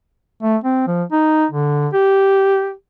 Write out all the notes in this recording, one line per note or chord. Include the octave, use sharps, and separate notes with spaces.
A3
C4
F3
D#4
D3
G4